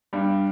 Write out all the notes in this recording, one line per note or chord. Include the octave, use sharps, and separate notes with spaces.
G2 G3